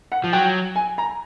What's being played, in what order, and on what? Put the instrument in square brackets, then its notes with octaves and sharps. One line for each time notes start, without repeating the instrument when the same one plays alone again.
[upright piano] F#5
[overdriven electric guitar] F3
[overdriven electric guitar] F#3 [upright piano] G5
[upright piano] G#5
A#5